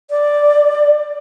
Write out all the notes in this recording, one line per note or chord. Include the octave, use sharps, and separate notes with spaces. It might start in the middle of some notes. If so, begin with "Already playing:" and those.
D5